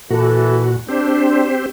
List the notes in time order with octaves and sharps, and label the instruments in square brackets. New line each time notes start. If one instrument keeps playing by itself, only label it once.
[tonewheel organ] A#2 F#4 [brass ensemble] E3 A4
[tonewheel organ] C4 G4 C5 [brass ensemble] D4